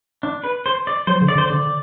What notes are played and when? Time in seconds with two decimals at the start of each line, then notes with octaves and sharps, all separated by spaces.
0.23 D4
0.44 B4
0.66 C5
0.87 D5
1.07 F#3 C5
1.22 D3
1.28 D5
1.36 D3 C5
1.48 D3 D5